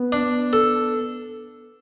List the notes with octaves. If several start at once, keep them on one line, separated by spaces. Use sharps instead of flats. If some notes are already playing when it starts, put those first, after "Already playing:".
Already playing: B3
D4
A4